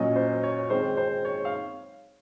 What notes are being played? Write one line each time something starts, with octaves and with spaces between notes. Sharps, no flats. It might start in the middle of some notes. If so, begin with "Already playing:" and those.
Already playing: A#2 F#3 C#4 D#5
C5
C#5
D#3 G#3 C4 C5
C5
C#5
F5